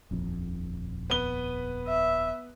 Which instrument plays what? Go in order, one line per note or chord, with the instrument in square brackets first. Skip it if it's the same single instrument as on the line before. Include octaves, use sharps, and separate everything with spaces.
[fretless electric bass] D#1 A#1 F2
[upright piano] B3 B4 G7
[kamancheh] E5